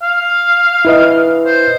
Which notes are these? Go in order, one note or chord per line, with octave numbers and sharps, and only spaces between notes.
F5
E4 B4 D#5
C5